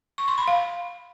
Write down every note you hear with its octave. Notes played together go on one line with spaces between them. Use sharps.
C#6
C6
B5
F5